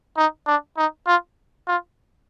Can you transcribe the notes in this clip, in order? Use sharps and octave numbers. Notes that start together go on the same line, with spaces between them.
D#4
D4
D#4
F4
F4